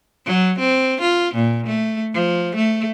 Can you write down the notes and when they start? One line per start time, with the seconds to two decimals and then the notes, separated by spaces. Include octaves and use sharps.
0.25 F#3
0.59 C4
1.01 F4
1.34 A#2
1.66 A3
2.14 F3
2.56 A3